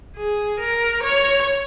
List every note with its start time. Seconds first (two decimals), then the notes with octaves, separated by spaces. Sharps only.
0.16 G#4
0.60 A#4
1.03 C#5